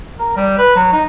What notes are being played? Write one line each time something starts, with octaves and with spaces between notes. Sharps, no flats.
A#4
G3
B4
F#3
D#4